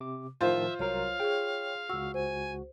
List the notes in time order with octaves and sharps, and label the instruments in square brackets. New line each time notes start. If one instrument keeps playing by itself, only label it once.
[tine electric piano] C3 D6
[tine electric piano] A2 D#3 F3 [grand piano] F4 C5 [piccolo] E5
[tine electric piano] C2 F#3 A#4 [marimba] C#5 [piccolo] F5
[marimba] G#4 [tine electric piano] C#5 G5
[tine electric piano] C#2 F#4 [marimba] E6
[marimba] C5 [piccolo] G#5